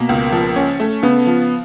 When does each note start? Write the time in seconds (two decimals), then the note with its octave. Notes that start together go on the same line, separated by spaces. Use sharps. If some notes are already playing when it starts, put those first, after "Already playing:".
Already playing: B2 A#3
0.09 C#2
0.32 F3
0.56 C#4
0.80 A3
1.03 C#3 B3
1.27 F3